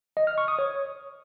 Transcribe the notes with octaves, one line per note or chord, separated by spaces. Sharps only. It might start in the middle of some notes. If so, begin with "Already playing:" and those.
D#5
F6
C#6
D#6
C#5